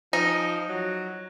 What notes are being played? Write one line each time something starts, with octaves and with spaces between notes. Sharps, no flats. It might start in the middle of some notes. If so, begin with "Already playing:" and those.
F3 D#4
F#3